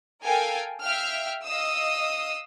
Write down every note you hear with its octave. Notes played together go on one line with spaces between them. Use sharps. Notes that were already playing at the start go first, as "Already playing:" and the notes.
A4 A#4 F5 G5 G#5
E5 F5 G5 F6
D#5 F5 D#6 E6